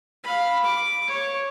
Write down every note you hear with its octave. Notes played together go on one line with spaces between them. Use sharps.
F5 B5
D6
C#5